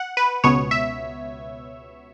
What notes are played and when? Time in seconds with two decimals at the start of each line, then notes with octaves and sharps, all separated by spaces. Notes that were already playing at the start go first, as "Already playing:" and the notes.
Already playing: F#5
0.17 B4
0.44 C#2 B2 B3 C#5
0.71 E5